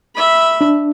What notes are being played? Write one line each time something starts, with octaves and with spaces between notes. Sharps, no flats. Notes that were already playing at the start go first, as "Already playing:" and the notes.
E5 B5
D4